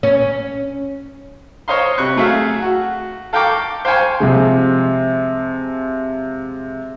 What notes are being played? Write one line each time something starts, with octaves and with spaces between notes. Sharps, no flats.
C#4
C5 C#5 D#5 F5 C6
C3 C#6 F#6
F#3 A3 G#4 E5 F5
F#4
A4 F5 G5 A#5 C#6 D6
C5 F5 G5 G#5 C#6
C3 F3 G#3